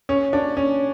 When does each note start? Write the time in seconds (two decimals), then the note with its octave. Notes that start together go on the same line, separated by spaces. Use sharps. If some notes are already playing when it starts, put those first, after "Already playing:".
0.09 C#4
0.33 D4
0.57 C#4